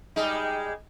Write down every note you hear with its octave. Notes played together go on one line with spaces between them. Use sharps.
G3 G#3 D#4